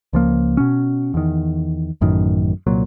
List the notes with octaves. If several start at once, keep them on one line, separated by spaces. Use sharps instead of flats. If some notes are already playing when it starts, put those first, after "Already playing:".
C#2 F3 A#3
B2 C#4
E2 D#3
A1 F#2 A2 D#3
C2 A#2 F#3